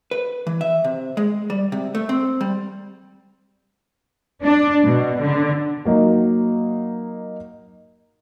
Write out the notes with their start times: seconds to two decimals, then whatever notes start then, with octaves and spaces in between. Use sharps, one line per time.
0.11 B4
0.47 E3
0.61 E5
0.84 C3
1.17 G#3
1.50 G3
1.72 C3
1.95 A3
2.09 C4
2.41 G3
4.43 D4
4.85 B2
5.21 D3
5.85 F#3 A#3 D#4 F#4